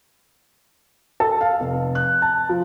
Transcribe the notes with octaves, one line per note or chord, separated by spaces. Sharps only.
A4
F5
F1
F#6
A5
F3